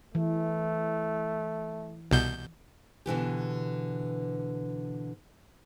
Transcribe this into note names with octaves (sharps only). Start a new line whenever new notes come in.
E3 A3
C2 B2 G6
B2 D3 E3 G4